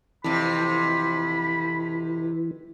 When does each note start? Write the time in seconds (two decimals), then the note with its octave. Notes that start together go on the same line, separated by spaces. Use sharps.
0.24 F2 C3 E3 B5